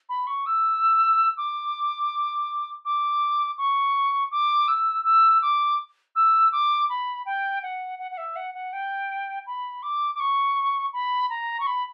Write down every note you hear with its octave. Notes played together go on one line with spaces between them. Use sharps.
B5
C#6
E6
D6
D6
C#6
D6
E6
E6
D6
E6
D6
B5
G5
F#5
F#5
F#5
E5
F#5
F#5
G5
B5
D6
D6
C#6
B5
A#5
C#6
B5